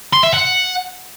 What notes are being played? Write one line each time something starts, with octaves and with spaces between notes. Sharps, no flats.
C6
E5
F#5